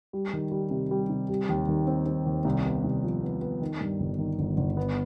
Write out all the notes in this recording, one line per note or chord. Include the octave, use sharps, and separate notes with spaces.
G3
D#3
G3
C3
G3
C3
G3
D#2
D#3
C4
C4
D#2
C2
B3
C2
F3
B3
B3
D#3
G2
G1
D#3
G1
G1
B3